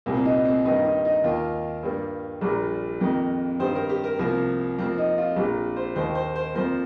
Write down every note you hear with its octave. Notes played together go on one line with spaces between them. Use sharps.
C2 A#2 G3 A#3
C4
D#4
C4
G2 D#3 A#3 D#4
D#4
D#4
D#2 D#3 A#3 F4
G2 G3 A#3
A#1 A#2 G3 A#3
F2 D#3 A#3
G2 D#3 G3 C5
A#4
G4
A#4
C2 C3 F3 A#3 A#4
F2 F3 A#3 C4
D#4
F4
A#1 A#2 A#3 G4
C5
D#2 D#3 A#3 C5
C5
C5
F2 F3 A#3 C5